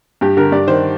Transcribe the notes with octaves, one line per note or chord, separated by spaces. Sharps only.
G2 G4
D3 A#4
G2 D5
D#3 C5